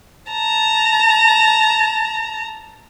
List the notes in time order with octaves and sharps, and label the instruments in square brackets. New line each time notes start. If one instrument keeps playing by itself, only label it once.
[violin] A5 A#5